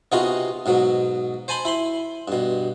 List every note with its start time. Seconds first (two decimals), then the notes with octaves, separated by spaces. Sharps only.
0.12 C3 B3 D#4 F4 F#4 G#4
0.66 G#2 B2 F#3
1.48 C5 G#5 A5 B5 C6
1.65 E4 B5 C6
2.28 G2 B2